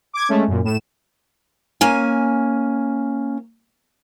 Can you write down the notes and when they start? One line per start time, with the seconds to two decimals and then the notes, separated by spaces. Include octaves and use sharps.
0.13 D6 G#6
0.29 G#3 A3 C#4
0.48 F#2 A#2
0.64 A2 E7
1.81 A#3 C#4 G#5